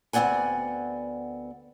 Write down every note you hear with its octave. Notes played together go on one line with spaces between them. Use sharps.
D2 B3 C4 D5 F#5 G#5